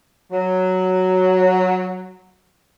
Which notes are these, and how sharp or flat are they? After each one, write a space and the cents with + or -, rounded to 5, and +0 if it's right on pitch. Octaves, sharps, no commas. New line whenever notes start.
F#3 +0